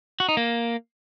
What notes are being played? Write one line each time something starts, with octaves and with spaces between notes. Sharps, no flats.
F#4
D#4
A#3